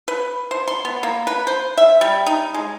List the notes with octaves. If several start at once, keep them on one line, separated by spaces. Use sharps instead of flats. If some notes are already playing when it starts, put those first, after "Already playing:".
B4
C5
C6
B3
A#3
B4
C5
E5
G3
D#4
G#3